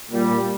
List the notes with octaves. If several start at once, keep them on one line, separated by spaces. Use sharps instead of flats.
A#2 G3